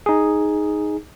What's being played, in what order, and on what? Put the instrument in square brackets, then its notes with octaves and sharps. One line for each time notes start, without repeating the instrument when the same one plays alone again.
[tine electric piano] D#4 G#4